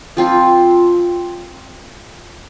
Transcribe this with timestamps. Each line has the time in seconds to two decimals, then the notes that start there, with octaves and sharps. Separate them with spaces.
0.17 F3 C4 F4